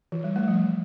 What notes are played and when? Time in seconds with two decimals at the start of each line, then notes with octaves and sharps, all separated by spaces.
0.12 E3
0.24 G3
0.36 A3
0.48 F3